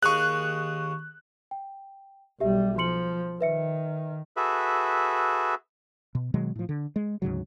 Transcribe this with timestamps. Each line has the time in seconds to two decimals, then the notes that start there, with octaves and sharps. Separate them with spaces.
0.03 D#2 G#4 C#6 F#6
1.51 G5
2.40 B1 G3 G4 E5
2.78 F3 C6 C#7 F#7
3.41 D#3 B4 E5 C#7
4.37 F#4 G#4 A4 B4 E5
6.15 B2
6.34 B2 D#3 F#3 G#3
6.56 A2 F3
6.69 D3
6.96 G#3
7.22 D2 G#2 C#3 F#3